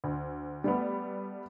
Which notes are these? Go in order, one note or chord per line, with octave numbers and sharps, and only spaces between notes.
D2
G3 A3 B3